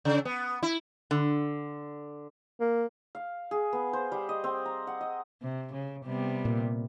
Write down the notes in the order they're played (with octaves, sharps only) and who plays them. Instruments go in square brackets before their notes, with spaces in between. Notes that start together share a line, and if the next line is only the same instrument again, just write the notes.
[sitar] C#3
B3
E4
[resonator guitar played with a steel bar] D3
[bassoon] A#3
[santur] F5
G#4
B3
C5
G3
D#5
C4
A#5
F#5
D#5
[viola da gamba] C3
C#3
C3 G3 B3
[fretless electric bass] A#2